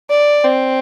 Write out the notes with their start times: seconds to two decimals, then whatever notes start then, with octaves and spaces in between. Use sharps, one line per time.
0.10 D5
0.44 C4